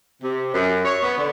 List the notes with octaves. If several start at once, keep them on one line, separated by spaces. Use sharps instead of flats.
C3
F#2
C#5
B3
D3